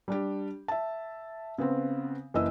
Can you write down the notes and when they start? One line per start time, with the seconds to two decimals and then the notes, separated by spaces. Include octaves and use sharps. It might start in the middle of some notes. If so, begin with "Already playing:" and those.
0.08 G3 D4 G4
0.68 E5 A5
1.58 C#3 B3 C4
2.34 F#1 E3 D#5 E6